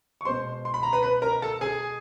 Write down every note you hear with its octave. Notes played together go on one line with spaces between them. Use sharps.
C#6
B2 G#3 C5 C6
C6
B5
A#5
B4 B5
B4 B5
A#4 A#5
A4 A5
G#4 G#5